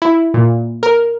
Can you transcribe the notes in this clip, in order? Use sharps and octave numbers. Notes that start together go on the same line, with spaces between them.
E4
A#2
A#4